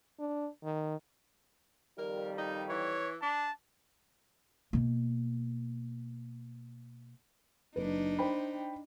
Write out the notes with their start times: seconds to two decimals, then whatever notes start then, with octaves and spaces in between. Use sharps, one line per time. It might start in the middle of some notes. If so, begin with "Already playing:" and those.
0.19 D4
0.64 D#3
1.98 F2 D#3 G3 A#4
2.38 D#4
2.70 E3 C#5
3.22 D4 A5
4.73 B2 A#3
7.76 F#1 D4 D#4 B4
8.19 C5 G5 B5